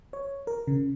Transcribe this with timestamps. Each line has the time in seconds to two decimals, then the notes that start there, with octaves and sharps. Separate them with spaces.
0.13 C#5
0.47 A#4
0.67 C#3